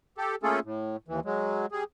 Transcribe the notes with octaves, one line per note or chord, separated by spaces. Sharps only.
G4 A4
A3 A#3 C#4 F4 G#4 A4
A2
D#2 E3
F#3 G#3
G3 G#4